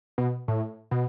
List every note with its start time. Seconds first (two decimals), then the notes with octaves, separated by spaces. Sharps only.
0.18 B2
0.48 A2
0.91 B2